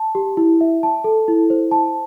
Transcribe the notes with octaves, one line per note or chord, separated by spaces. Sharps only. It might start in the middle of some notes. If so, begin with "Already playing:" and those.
Already playing: A5
G4
E4
E5
A5
A4
E4
C5
A5